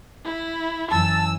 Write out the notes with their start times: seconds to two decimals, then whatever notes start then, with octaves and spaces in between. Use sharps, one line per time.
0.25 E4
0.91 F#2 E3 A5 E6